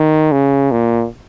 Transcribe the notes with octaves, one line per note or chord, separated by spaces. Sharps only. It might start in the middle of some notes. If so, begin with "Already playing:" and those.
Already playing: D#3
C#3
A#2